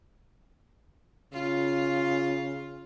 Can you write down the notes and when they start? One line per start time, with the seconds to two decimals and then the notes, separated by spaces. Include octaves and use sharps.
1.33 C#3 F4